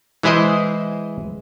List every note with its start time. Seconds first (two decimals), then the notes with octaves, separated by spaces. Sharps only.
0.23 E3 G#3 E4 G#4 C5 D#5